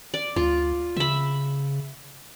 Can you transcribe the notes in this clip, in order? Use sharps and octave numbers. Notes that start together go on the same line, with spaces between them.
D5
D2 F4
C#3 E5 B5